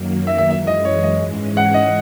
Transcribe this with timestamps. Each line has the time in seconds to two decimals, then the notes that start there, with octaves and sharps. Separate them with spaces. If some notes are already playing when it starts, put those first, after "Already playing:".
Already playing: F#2 D#3 F#3 A#3
0.27 E5
0.38 E5
0.50 F#2 E3 G#3 E5
0.67 D#5
0.85 C#5
1.03 D#5
1.21 G#2 E3 G#3 C#4
1.57 F#5
1.74 D#5